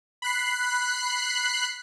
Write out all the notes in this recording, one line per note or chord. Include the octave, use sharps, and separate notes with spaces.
B5 F#6 C7